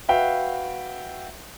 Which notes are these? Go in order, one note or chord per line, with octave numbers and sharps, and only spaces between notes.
F#4 B4 E5 F5 G5